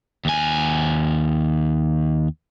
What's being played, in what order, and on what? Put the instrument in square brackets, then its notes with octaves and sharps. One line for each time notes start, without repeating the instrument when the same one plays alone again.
[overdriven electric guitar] D#2 G#5